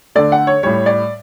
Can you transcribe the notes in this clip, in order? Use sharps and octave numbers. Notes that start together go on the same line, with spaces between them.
D3 A3 D5
F#5
C#5
A2 G3 C#5
D5